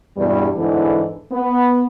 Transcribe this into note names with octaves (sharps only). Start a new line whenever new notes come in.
E2 G2 B2 G3
E2 G#2 D3 E3
B3